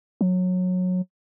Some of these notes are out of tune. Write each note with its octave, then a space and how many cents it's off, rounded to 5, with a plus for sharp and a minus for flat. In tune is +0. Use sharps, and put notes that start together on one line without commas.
F#3 -20